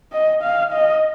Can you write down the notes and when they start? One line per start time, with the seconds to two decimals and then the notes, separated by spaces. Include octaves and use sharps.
0.12 D#5
0.43 F5
0.72 D#5